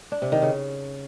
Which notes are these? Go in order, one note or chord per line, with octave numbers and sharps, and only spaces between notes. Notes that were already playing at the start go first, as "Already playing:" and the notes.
D4
C3
D#3
C#3